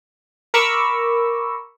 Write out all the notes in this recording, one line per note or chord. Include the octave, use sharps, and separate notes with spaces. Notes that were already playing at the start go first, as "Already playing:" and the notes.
A#4 A#5 B5 C#6 D6 E6